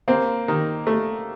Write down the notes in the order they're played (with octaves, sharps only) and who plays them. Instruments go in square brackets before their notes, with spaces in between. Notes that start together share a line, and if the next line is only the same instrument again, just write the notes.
[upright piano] A#3 [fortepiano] C4
[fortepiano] D#3
A3